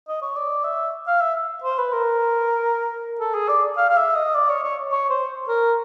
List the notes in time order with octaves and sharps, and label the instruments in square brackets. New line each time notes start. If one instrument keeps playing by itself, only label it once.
[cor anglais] D#5
C#5
D5
E5
F5
E5
C5
B4
A#4
A4
G#4
D5
F5
F5
E5
D#5
D5
C#5
C#5
C#5
C5
A#4